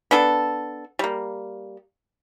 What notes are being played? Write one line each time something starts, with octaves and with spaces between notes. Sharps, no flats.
B3 D4 A4
G3 A#3